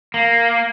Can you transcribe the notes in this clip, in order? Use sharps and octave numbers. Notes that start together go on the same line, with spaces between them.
A#3